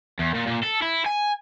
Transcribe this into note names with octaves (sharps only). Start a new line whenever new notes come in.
E2
A#2
A#2
A4
E4
G#5